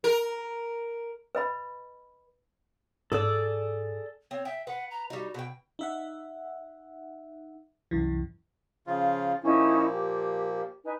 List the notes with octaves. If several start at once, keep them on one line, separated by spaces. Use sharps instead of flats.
A#4
B4 D#5 B5
G#2 G#4 A4 D5 E6
C4 C#5
E5 G5
B4 F#5
A#5
G3 D#4 F#4
B2 G5
D#4 E5 F#5
C2 F#2 E3
C#3 F3 F4
A#2 F3 A#3 C#4 D#4 E4
G4
D#4 B4 G#5